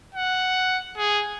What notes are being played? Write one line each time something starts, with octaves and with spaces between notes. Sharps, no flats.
F#5
G#4